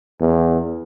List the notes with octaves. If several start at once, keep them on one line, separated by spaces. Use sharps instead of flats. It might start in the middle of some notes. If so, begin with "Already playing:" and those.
E2